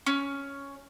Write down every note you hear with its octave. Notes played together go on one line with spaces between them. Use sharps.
C#4